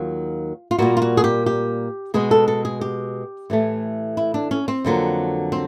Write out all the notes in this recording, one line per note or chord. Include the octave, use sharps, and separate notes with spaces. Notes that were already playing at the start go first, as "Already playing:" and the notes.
Already playing: D#2 D#3 F#3 F4
F4
A#2 G3 A#3 F#4
F4
F#4
G#4
G4
G4
B2 G#3 B3 G#4
A4
A4
G#4
G4
A2 E3 A3
E4
D4
C#4
C4
F2 D3 F#3 A#3
C4